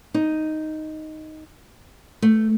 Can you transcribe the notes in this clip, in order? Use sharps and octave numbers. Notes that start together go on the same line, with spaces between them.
D#4
A3